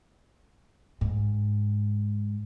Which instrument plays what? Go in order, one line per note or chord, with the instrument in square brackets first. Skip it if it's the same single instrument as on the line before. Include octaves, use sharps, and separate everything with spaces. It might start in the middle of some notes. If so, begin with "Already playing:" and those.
[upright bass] G#2